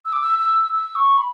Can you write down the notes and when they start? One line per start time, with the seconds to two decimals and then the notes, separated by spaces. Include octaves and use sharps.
0.05 E6
0.13 D6
0.21 E6
0.39 E6
0.73 E6
0.96 C#6
1.18 B5